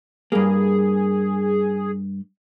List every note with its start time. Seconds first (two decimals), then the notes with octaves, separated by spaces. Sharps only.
0.32 G2 A#3 G#4